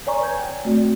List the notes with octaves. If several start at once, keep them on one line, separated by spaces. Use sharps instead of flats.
C#5 D5 G#5 A#5 C#6
B4 C#5 G6 G#6
G5 G#5
A3 C4 F#4 D5